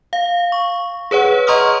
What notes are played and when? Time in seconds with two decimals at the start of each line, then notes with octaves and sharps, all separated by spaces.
0.13 F5
0.52 C#6
1.11 G#4 B4 C#5 F#5
1.47 D#5 A#5 C6 C#6 D#6 F6